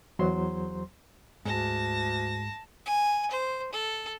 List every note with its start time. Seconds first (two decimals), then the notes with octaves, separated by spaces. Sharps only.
0.19 E2 F#3 C5 C6
1.45 D2 G#2 A5 A#6
2.86 G#5
3.31 C5
3.73 A4